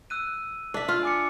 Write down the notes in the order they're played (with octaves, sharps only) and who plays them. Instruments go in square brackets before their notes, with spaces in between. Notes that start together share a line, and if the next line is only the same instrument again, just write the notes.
[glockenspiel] E6 F#6 D#7
[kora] D4 E5
F4
[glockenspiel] G#5 D6 C#7